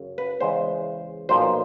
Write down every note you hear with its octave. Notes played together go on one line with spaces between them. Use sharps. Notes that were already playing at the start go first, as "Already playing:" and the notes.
Already playing: F#2 C#3
B4
E2 C#3 E3 G#3 C5
B1 A#2 F3 C5